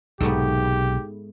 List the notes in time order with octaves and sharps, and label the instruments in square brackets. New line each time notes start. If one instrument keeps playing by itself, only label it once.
[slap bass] B1 C3 [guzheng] G#2 A3 B3 [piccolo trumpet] G4